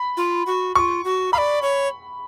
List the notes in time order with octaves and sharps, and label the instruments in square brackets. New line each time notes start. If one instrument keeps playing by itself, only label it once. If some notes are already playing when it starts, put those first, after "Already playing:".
Already playing: [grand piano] B5
[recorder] F4
F#4
[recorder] F4 F#4 [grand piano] C#6
[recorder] F#4
[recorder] F5 [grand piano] B5
[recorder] D5
C#5